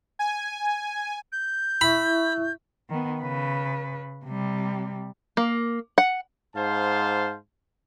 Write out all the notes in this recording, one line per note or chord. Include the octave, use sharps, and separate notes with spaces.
G#5
G6
E4 E5 B5 C#6
D#3 B3
C#3 B4
C3 G3
A#3
F#5
G#2 C5 F5 A5